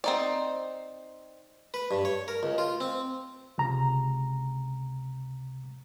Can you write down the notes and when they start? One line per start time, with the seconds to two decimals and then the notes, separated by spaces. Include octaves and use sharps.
0.04 C4 D#4 D5
1.74 B4
1.91 G2
2.05 C#5
2.28 A#4
2.43 C#2
2.58 F4
2.81 C4
3.58 C#2 C3 A#5